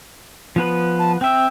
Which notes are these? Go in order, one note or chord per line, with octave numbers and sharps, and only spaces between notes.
F3 B3 B4
A5
C4 E5 G5